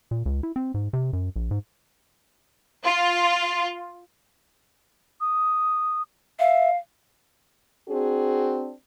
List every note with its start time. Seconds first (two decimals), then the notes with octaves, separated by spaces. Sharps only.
0.11 A#2
0.26 C#2
0.43 E4
0.56 C4
0.74 G#2
0.93 C3
1.13 F#2
1.36 A#1
1.51 G#2
2.84 F4
5.21 D#6
6.39 E5 F5
7.89 C4 D4 F#4 G#4